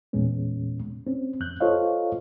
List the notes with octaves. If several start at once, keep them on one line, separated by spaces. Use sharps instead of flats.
E2 A#2 G#3 B3 C#4
C4 C#4
F2 F#6 G6
F4 A4 C5 C#5 D#5 F5